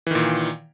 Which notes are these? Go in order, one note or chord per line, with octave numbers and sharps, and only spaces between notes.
A#2 D#3 E3